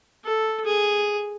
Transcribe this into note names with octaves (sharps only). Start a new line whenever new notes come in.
A4
G#4